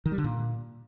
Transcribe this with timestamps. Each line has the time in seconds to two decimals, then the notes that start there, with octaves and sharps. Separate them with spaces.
0.06 D#3
0.12 G3
0.18 D3
0.24 A#2